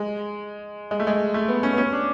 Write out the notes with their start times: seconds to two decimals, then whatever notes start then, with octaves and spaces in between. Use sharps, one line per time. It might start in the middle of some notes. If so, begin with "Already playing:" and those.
Already playing: G#3
0.91 G#3
1.00 A3
1.07 G#3
1.34 A3
1.48 B3
1.63 C#4
1.73 B3
1.78 C#4
1.93 D4